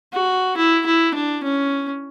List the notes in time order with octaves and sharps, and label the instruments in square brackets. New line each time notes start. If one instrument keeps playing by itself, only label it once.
[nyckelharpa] F#4
E4
E4
D4
C#4